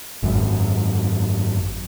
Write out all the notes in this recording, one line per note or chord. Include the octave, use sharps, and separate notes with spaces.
G#1 F#2